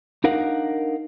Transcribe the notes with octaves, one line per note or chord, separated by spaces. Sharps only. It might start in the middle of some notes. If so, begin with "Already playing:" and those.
D4 D#4 A#4 F5 F#5